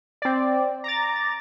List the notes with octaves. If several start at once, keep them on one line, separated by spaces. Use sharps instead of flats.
C4 D5
A#5 D6 A6